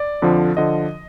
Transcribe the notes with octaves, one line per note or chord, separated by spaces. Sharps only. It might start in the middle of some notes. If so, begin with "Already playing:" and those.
Already playing: D5
F2 D3 F3
D3 F3 D#5